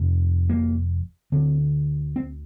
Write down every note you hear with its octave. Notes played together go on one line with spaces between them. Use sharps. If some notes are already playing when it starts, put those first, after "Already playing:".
Already playing: F1 F2 C3
A#3
D2 D3 C4
C4